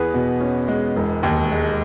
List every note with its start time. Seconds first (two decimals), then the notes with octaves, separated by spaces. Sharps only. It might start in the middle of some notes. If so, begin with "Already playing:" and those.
Already playing: E2 B3 G#4 B4
0.14 B2
0.40 C#4
0.68 G#3
0.96 E1
1.23 D#2
1.52 G#3